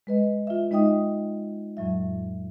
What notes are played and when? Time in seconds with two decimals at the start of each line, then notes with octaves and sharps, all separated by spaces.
0.07 G#3 B4 D#5
0.47 F4 E5
0.71 G#3 D#4 D#5 G5 D#6
1.77 F2 A2 F#3 E5